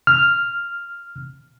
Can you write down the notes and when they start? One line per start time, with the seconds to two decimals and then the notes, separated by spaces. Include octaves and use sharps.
0.07 F6